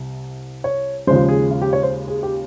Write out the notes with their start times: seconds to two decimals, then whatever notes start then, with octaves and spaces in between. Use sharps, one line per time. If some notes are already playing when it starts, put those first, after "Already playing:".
Already playing: C2 C3
0.64 C#5
1.07 D#2 C#3 F3 G#3 C5
1.29 G#4
1.51 F4
1.62 G4
1.73 C#5
1.83 C5
2.08 G#4
2.23 G4